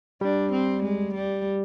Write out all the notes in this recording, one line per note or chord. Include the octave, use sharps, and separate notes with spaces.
G3 D4
C4
G#3
G3